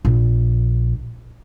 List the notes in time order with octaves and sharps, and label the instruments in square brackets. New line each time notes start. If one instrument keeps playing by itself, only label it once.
[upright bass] A#1